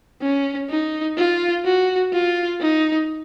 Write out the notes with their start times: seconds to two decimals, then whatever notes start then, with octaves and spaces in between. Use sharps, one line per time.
0.22 C#4
0.70 D#4
1.17 F4
1.65 F#4
2.13 F4
2.60 D#4